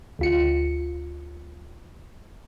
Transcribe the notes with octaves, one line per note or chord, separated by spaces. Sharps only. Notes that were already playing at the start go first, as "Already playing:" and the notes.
D2 F4 C#7